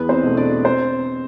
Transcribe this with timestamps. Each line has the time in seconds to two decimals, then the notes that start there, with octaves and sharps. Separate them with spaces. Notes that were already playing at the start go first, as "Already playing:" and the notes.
Already playing: E2 B3 B4
0.09 C4 C5
0.23 B2 A3
0.37 D4 D5
0.65 C4 C5